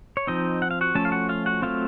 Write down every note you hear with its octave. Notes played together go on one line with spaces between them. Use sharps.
C#5
F3 C4 D#4 D#5
F#5
F5
F#4 F#5
F3 A3 C#4 A4 A5
F5
F#4 F#5
F4 F5
F#4 F#5
F#3 A3 C4 F4 F5